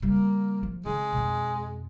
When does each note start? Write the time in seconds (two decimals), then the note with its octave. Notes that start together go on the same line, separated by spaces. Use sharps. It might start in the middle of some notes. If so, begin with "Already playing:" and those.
0.02 C#3 G3 A#3
0.63 F3
0.85 C#3 G#3 C4
1.13 F2 B2